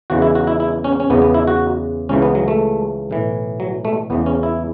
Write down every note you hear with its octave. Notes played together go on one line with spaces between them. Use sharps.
E2 C#3 E3 F#4
E4
F#4
E4
E4
C#4
C#4
E2 C#3 E3 B3
B3
E4
F#4
C#2 C#3 E3 C#4
B3
F#3
A3
B1 A2 E3
F#3
A3
E2 C#3 E3 B3
C#4
E4